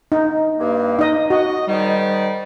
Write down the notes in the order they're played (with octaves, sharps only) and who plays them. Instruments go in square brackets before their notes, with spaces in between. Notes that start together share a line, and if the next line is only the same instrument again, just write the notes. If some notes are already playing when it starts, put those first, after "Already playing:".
[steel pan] D#4
[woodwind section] G2 A#3
[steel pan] D#4 D#5
[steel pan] F#4 [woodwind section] D#5
[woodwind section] G#2 D#3 G3